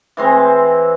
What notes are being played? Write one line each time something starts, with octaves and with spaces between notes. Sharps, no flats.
E3 G#3 C4